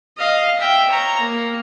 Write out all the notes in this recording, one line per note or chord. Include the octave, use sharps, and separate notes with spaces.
D#5 F5
E5 G5
C#5 A#5
A#3